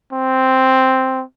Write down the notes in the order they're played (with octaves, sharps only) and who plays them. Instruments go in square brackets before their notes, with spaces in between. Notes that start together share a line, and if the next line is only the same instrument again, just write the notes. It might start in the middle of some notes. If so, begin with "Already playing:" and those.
[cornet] C4